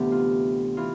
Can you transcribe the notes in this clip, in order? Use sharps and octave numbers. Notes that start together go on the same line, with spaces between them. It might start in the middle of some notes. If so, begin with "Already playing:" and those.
Already playing: D2 C3 E3 B3 G4
F4
E3 F4